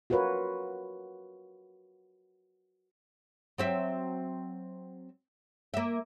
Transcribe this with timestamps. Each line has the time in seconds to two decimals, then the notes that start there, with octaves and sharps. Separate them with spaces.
0.10 F4 F#4 A#4 B4 C#5
3.58 F#3 C4 E5
5.74 A#3 E5